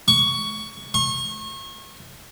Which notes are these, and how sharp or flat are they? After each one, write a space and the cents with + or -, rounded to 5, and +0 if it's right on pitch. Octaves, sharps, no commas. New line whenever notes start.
C#6 +15
C#6 -35